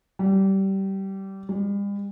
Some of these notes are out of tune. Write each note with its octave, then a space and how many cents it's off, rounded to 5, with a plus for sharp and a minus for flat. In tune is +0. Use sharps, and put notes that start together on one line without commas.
G3 -20
G3 +45